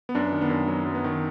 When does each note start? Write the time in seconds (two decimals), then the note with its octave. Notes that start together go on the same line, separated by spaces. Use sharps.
0.09 B3
0.15 F#2 D4
0.33 D#3
0.42 B3
0.50 F#2
0.68 F#3 B3
0.85 F#2
0.95 B3
1.04 D#3